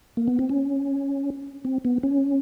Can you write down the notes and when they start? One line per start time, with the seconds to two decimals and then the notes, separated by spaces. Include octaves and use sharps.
0.17 A#3
0.28 B3
0.39 C4
0.49 C#4
1.65 C4
1.85 B3
2.03 C#4